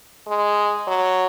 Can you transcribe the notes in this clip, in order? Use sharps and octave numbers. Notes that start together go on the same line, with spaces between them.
G#3
F#3